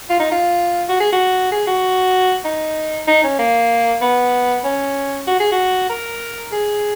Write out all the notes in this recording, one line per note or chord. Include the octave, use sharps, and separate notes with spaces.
F4
D#4
F4
F#4
G#4
F#4
G#4
F#4
D#4
D#4
C#4
A#3
B3
C#4
F#4
G#4
F#4
A#4
G#4